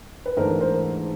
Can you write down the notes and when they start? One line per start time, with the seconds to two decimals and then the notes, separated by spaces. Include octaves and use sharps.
0.26 B4
0.37 G#2 E3 A3 D4 A#4 C5
0.60 A#4 C5